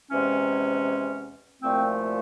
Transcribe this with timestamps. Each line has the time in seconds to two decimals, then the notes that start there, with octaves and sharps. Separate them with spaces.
0.11 E2 C3 E3 G#3 C#4
1.61 C2 A#2 F3 A3 C4